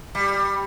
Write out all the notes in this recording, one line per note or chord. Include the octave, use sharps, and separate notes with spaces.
G3